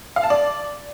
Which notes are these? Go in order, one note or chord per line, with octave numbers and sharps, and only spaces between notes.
F5
A5
D5